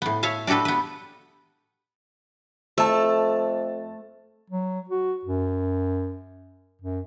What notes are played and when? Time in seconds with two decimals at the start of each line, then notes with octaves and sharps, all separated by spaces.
0.02 A2 B3
0.23 C#5 E5 F5 A5
0.47 D4 F#4 G4 A4 B4
0.65 B3 B4
2.78 F2 A3 A5 E6
4.50 F#3
4.89 F#4
5.25 F#2
6.82 F#2